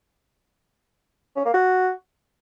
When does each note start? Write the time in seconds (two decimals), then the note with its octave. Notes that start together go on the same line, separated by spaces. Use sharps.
1.36 C#4
1.45 A#3
1.54 F#4